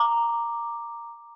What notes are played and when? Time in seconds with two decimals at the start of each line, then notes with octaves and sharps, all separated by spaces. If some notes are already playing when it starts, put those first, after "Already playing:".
Already playing: A#5 D6